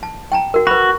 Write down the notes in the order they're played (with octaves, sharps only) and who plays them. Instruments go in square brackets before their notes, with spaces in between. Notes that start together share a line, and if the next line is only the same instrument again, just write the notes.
[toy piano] A5
G5 A5 A#5
F#4 A#4
[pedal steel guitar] F#4 [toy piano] B4 B5